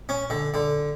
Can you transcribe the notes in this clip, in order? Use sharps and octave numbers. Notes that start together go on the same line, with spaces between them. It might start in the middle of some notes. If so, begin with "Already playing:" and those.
C#4
D3
D3